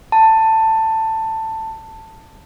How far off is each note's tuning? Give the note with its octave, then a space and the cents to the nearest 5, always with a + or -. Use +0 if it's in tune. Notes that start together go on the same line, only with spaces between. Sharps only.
A5 +15